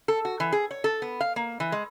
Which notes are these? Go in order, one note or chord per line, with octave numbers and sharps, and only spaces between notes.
A4
F#4
E3
G#4
C#5
A4
B3
F5
A#3
E3
G#3